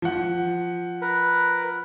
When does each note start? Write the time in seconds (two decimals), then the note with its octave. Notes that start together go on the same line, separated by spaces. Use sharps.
0.02 F3 F#5
1.02 A#4 B4